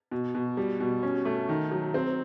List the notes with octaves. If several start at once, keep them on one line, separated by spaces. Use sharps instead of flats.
B2
B2
G3
B2
C#4
A3
D#3
F#3
C4